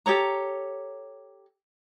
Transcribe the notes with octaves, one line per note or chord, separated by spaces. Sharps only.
G4 A4 C#5 A#5